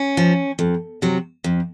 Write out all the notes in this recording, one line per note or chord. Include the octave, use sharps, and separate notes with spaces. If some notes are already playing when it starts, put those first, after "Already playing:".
Already playing: C#4
F3
F2
C3 F#3
F2